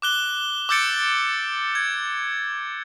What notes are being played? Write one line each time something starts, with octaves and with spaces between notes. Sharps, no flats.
D6 F#6 G7
D6 E6 G6 A6 C#7 D7
G#6